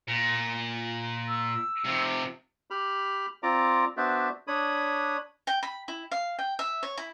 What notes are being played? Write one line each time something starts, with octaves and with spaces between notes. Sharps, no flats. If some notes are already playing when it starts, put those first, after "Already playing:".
A#2
E6
C3 F3
G4 B5 F6
C4 F4 D5 A#5 D6
B3 D4 F#4 C5 D5 E5
D4 C#5 B5 D#6
G5
B5
E4
F5
G5
E5
C#5
E4